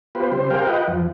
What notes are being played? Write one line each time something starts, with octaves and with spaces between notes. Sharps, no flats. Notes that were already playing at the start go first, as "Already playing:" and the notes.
B3 F4 G4 B4 C5
C#3 G3 C4 C5
G4 G#4 A#4 C5 F5 G5
F4 B4 D#5 F#5 G5
F2 F3